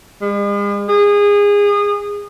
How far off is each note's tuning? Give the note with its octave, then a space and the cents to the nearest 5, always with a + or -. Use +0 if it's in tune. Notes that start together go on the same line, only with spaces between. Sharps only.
G#3 -45
G#4 -25